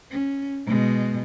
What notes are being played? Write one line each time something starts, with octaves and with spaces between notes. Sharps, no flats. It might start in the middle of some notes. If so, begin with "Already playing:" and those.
C#4
B2 G#3